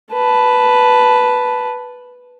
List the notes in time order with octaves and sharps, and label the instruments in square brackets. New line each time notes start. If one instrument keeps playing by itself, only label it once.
[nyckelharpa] B4 A5